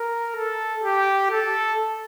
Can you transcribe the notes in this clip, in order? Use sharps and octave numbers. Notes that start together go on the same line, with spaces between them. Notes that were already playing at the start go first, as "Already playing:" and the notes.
Already playing: A#4
A4
G4
A4